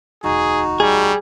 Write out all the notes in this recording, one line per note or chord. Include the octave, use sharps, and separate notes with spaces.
E1 D2 D#4 F#4 G#4
G3 G#4